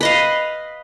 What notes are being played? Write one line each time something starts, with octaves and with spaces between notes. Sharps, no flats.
B4 D#5 F5